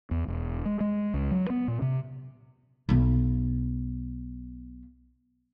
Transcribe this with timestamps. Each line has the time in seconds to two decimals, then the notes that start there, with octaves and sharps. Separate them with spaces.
0.11 E2
0.28 E1
0.66 G#3
0.80 G#3
1.14 C#2
1.31 F#3
1.50 B3
1.68 A#2
1.82 C3
2.89 B1 F4